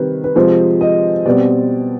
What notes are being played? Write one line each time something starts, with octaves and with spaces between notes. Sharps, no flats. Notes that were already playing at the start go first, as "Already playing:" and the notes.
Already playing: C3 D#3 G3 C4 B4
B4
C3 F3 G#3 C4 C5
D#5
B2 G3 C4 D5